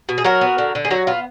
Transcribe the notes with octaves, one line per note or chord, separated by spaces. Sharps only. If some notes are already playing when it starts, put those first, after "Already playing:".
B2
G#4
F#3 F#4 A#4
B3
D3
D3
G#4
F#3 F#4
B3 F4